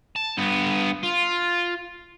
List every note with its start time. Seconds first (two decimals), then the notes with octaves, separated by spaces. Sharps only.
0.16 A5
0.37 G2 B3
1.04 F4